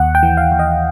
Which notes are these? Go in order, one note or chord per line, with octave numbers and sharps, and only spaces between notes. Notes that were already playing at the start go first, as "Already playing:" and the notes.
Already playing: D#2 F#5
G5
E3
F5
D#2
D#5